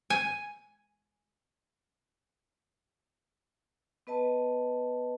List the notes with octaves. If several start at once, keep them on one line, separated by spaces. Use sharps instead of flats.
G#5
B3 B4 D#5 A5